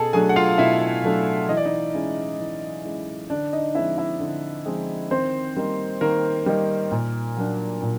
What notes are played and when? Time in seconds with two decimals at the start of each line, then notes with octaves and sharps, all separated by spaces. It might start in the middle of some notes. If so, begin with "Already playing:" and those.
Already playing: B2 G#4 A4 A5
0.13 F#3 A3 D4 G#4 G#5
0.29 F#5
0.36 F4 F5
0.58 B2 E4 E5
1.04 F#3 A3 D4
1.48 E3 D#5
1.57 D5
1.65 D#4 D#5
1.94 G#3 C#4 E4
2.39 E3
2.84 G#3 C#4 E4
3.30 D3 D4 D5
3.53 D#4 D#5
3.75 F3 G#3 C4 D#4 E4 E5
3.98 E4 E5
4.20 D3
4.66 F3 G#3 C4 D#4
5.11 D#3 C4 C5
5.56 G3 A#3 D#4
6.01 D#3 A#3 A#4
6.46 G3 A#3 D#4
6.92 A#2
7.37 F#3 A#3 D4
7.83 A#2